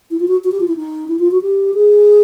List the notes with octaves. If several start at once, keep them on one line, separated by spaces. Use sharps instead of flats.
E4
F4
F#4
F#4
G4
F4
E4
D#4
E4
F4
F#4
G4
G#4